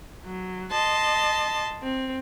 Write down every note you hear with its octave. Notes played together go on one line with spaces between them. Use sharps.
F#3
D#5 A5 C6
C4